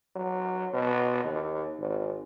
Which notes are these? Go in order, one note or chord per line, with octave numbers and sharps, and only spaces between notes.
F#3
B2
D#2
G#1